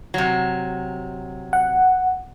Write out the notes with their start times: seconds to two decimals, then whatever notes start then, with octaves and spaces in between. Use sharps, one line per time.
0.14 C3 F#3
1.53 F#5